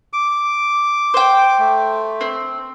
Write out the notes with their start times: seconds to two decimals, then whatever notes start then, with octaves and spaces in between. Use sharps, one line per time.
0.13 D6
1.14 C5 G5
1.59 A3
2.21 C4